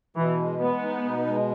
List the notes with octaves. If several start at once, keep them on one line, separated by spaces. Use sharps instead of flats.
B2 E3
G#3
G#3 B3
D#4
B2
G#3